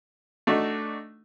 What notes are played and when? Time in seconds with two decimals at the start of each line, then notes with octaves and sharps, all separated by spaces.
0.47 A3 D4 D#4 F#4